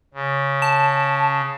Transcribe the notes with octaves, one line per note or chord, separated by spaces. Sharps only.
C#3
A5